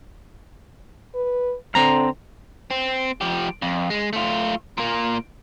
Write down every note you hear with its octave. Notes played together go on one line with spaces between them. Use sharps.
B4
D3 C4 A#5
C4
F3 G4
F2
G#3
A3 F4
A#2 A#3